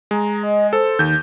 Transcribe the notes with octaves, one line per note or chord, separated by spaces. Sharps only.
G#3 A#5
D#5
A4 C5
D#2 D#3 G6